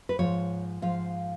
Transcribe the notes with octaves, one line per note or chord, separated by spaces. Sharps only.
B4
G#2 F3 C#5
G#2 F3 F5